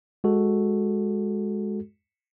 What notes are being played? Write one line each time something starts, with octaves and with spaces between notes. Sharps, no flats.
G#3 F#4 A4